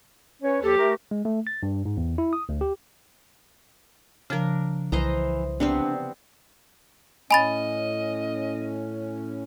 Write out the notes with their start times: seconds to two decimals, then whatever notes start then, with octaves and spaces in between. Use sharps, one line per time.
0.42 C#4 B4 C#5
0.63 D#2 F3 G4 A4
0.78 A3 A#4
1.11 G#3
1.25 A3
1.47 A6
1.63 G2
1.85 G#2
1.97 E2
2.18 E4
2.33 D#6
2.49 D2
2.61 G4
4.30 C#3 F3 D4 A#4
4.92 C2 E3 C5 D#5 A#5
5.60 C3 B3 C4 D4
7.31 A2 C#4 D#5 G#5 B5 A6